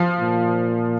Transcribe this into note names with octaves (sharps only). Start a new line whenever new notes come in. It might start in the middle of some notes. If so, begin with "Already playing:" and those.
Already playing: F3
A#2